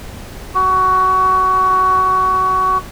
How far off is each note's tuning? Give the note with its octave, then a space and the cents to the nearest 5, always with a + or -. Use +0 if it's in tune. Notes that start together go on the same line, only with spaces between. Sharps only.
F#4 +20